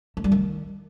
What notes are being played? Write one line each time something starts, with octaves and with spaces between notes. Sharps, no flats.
A3
G3
D#3